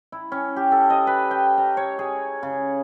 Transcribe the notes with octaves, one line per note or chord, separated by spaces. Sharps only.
E4
C#4
G4
A4
D#5
B4
G5
A#5
C#5
G#4
C#3